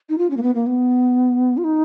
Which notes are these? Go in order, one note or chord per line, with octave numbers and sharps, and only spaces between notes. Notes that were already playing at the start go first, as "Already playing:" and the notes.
D#4
F4
C#4
A#3
B3
A#3
B3
F4
D#4